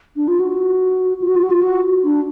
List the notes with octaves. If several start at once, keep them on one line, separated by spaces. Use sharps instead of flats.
D4
F4
F#4
F4
F#4
F4
F#4
F4
F#4
D4